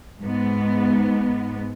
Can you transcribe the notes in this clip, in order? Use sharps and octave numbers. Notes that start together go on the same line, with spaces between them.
G#2 B3